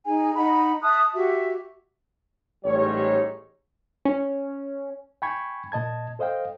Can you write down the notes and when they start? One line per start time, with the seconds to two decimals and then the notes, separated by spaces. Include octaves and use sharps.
0.05 D#4 G#4 G#5
0.35 D#4 F#5 B5
0.82 E5 A5 D#6 F#6
1.15 F#4 G4 E5
2.64 A1 G#2 G3 C#5
4.05 C#4
5.22 G5 G#5 B5 C#6 G#6
5.72 A#2 D#5 A5 G#6
6.19 A4 C5 D#5 F5 G5